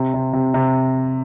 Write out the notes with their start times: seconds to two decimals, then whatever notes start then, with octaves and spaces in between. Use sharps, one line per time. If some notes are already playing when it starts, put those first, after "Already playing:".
Already playing: C3
0.14 C3
0.33 C3
0.54 C3